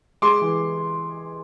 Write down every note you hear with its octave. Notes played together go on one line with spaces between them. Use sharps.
G#3 C6 D6
E3